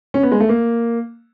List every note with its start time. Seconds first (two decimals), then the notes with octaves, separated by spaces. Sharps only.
0.14 C#4
0.23 B3
0.32 G#3
0.40 A3
0.49 A#3